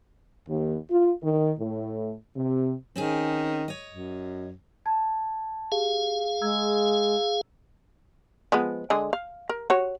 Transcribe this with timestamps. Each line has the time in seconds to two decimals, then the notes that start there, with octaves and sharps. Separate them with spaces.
0.48 D#2
0.91 F4
1.23 D#3
1.59 A2
2.36 C3
2.96 D#3 C4 C#4 G#4
3.68 C#5 D#5
3.90 F#2
4.86 A5 G#6
5.72 G4 G#4 F5
6.41 G#3 A#5 E6 G#6
8.52 F3 G#3 B3
8.90 D3 G#3 G#4
9.13 F5
9.49 A#4
9.70 F#4 C#5